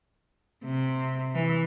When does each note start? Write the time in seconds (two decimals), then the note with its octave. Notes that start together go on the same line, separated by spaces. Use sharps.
0.64 C3
1.35 E3